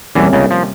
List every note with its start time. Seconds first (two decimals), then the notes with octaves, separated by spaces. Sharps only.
0.15 E2 C3 E3 G3 A#3 C#4
0.33 C#2 C#3
0.51 F3